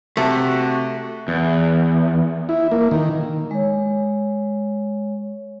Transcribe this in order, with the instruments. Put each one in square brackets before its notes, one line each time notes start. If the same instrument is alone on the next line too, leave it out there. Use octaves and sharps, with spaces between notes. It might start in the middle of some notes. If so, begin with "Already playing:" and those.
[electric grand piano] C3 [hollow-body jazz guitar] A3 [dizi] F#4
[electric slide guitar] E2
[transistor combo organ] E4
A#3
D#3
[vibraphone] G#3 C#5